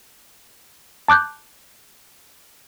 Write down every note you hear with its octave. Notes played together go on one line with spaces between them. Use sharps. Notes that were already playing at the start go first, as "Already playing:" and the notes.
A5 D6 F#6 G6